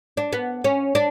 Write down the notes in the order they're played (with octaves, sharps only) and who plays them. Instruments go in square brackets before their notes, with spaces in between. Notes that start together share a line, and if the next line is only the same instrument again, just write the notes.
[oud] D4
B3
C#4
D4